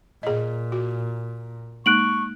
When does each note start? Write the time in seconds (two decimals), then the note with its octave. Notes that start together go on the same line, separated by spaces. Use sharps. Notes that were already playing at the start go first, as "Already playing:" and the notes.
0.23 A#2 G#4 D#5
0.72 F#4
1.86 G#3 A#3 D#4 C#6 F#6 D7 F#7